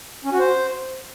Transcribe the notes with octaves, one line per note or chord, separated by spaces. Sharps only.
C#4
F#4
C5